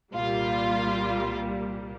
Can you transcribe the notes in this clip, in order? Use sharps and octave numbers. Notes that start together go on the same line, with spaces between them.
C2 A#2 G3 F4